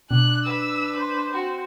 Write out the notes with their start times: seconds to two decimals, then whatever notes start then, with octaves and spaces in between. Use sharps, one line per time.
0.11 B2 D4 F#6
0.45 B4 E6
0.97 C5
1.33 C4 F#4